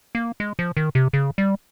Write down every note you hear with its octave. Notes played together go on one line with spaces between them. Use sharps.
A#3
G#3
F3
D#3
C3
C#3
G3